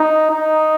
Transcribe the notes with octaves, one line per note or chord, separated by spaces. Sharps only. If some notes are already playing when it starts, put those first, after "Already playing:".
Already playing: D#4
D#4